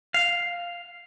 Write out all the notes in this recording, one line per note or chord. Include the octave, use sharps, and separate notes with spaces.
F5